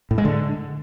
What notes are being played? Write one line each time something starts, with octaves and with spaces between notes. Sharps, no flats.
A2
G#3
D3